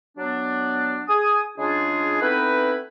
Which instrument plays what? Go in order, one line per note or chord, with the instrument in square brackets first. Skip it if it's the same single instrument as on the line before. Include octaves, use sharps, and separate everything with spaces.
[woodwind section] F#3 B3 D4
G#4 G#5 D#6
C#3 G#3 D4 F4 G#4
A3 B3 C4 D#4 E4 B4